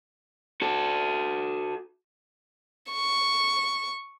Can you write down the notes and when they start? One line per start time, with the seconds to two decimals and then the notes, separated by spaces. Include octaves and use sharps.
0.62 F#4 A4
2.92 C#6